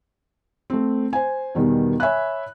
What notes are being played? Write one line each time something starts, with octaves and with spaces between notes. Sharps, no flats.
A3 C4
C5 G#5
E2 B2 D#3 G3
C#5 E5 G#5 B5 F#6